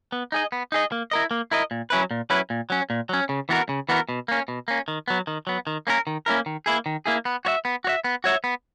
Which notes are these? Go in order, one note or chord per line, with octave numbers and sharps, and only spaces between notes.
B3
D#4 G#4 D#5
B3
D#4 G#4 D#5
A#3
E4 A#4 D#5
A#3
E4 A#4 D#5
A#2
F#3 C#4 E4 B4
A#2
F#3 C#4 E4 B4
A#2
F#3 C#4
A#2
F#3 C#4
C#3
E3 B3 F#4 A#4
C#3
E3 B3 F#4 A#4
B2
A#3 C#4
B2
A#3 C#4
D#3
F#3 B3
D#3
F#3 B3
D#3
A#3 C#4 E4 A#4
D#3
A#3 C#4 E4 A#4
D#3
A#3 E4 G#4
D#3
A#3 E4 G#4
B3
F#4 C#5 E5
B3
F#4 C#5 E5
B3
F#4 C#5 E5
B3